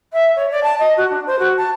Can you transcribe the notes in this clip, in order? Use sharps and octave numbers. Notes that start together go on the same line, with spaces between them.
E5
C#5
D5
A5
D#5
F#4
D4
C5
F#4
A5